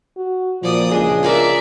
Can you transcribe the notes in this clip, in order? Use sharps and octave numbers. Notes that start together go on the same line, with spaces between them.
F#4
A#2 F3 D5 D#6
C#2 D4 G#4 D#5
F4 A#4 D5 E5 G#5 C6